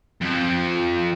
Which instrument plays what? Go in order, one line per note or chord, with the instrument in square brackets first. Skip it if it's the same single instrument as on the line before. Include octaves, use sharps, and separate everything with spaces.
[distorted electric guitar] F2 F3